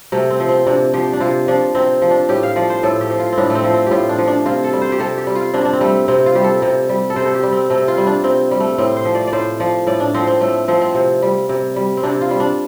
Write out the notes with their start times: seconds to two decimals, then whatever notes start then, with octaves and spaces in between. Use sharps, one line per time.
0.12 C3 A3
0.30 C4
0.40 F3
0.49 C4
0.66 C3 D4
0.94 F3 G4
1.13 D4
1.20 C3 F4
1.48 F3 D4
1.75 C3 C4
2.02 F3
2.11 D4
2.29 A2 G4
2.43 F5
2.56 F3 D5
2.70 C5
2.83 A2 A4
3.01 G4
3.10 F3
3.19 F4
3.33 C4
3.38 A2 D4
3.50 A3
3.55 C4
3.64 F3
3.73 C4
3.86 A2 F4 G4
4.09 D4
4.18 F3
4.28 D4
4.46 C3 F4
4.64 A4
4.73 G3
4.82 C5
4.92 G4
5.00 C3 A4
5.18 G4
5.27 G3
5.35 F4
5.54 C3 D4
5.65 D4
5.73 C4
5.81 G3 A3
6.08 C3 C4
6.26 F4
6.35 G3 G4
6.44 A4
6.62 C3
6.89 G3
7.10 A4
7.16 C3 C5
7.27 A4
7.35 G4
7.43 G3
7.53 C4
7.70 C3 A3
7.88 F4
7.98 G3
8.07 D4
8.24 C3 C4
8.51 G3
8.60 A3
8.78 A2 C4
8.97 C5
9.05 F3
9.15 D5
9.27 D5
9.33 A2 C5
9.60 F3 D5
9.87 A2 D5
10.00 D4
10.14 F3 C4
10.27 C4
10.40 A2 A3
10.68 F3 C4
10.81 C4
10.95 C3
11.22 G3
11.49 C3
11.76 G3
11.97 C4
12.03 C3 D4
12.21 F4
12.31 G3
12.40 D4